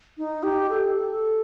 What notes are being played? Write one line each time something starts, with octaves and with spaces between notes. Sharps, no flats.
D#4
G4
A4
A4